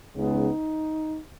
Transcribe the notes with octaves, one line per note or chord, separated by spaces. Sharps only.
C#2 C#3 G#3 B3 D#4